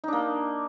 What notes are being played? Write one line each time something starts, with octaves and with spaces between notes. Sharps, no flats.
A#3 D4 D#4